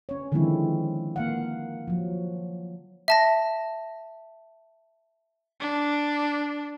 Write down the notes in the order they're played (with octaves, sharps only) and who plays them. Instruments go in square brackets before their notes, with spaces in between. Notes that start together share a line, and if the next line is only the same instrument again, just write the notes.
[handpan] C#4 C#5
D3 D#3 F3 G#3 C4 E4
A#3 F5 F#5
F3 F#3
[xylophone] E5 A5 A#6
[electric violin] D4